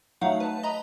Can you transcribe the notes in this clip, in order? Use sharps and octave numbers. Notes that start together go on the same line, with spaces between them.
F#3 A3 D#4 F5 F#5
B4 A5
D#5 A#5 B5